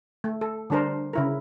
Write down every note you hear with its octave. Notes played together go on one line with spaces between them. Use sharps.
A3
A4
D3 G3 D4 A#4 C5
C#3 E4 A#4